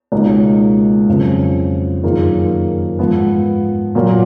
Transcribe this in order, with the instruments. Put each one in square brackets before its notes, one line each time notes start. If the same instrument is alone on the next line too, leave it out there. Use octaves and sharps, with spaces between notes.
[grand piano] C#2 B2 A#3 D#4 F#4
F2 C#3 F#3
F#2 D#3 A#3 F4 G#4
G#2 F3 B3
A#2 F#3 A#3